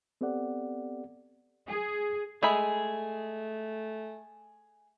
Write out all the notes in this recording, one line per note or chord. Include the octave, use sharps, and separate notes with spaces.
B3 C4 G4 A4 D5 F#5
G#4
G#3 A3 G#4 E5 B5